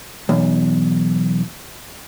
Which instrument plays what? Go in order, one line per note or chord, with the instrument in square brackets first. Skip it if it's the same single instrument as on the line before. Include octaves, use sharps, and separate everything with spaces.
[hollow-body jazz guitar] B1 E2